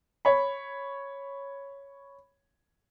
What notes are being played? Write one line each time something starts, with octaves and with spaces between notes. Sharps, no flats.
C#5 B5